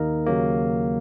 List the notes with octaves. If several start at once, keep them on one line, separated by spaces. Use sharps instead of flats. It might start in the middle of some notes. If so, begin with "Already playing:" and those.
Already playing: D#2 D#3 A#3 D#4 A#4
D#2 C#3 F#3 A#3